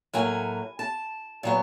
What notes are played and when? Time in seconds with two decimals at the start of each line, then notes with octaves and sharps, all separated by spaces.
0.13 A2 F#3 A#3 G#5
0.79 A5
1.43 A#2 F#3 B3